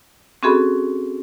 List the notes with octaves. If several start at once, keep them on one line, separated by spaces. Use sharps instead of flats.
C4 C#4 F#4 G#4 A4 B5